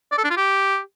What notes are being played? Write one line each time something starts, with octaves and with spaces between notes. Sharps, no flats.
D5
A4
D4
F4
G4